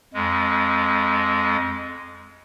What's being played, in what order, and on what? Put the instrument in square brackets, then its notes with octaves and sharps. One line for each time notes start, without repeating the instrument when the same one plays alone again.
[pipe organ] F2 G#3